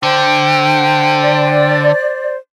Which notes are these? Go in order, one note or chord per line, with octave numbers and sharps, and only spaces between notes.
D3 C5 G5
D5